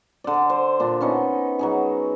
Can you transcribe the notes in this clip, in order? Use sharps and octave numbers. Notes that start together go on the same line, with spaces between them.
D3 D5
C5
A#2 D4
B3 C#4 D#4
F#3 D#4 G#4